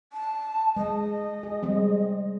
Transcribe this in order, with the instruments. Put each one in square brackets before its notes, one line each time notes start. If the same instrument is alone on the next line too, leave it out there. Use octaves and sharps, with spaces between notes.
[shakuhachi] A5
[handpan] G#3 [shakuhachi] D#5
[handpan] G#4
G3 G#3 C4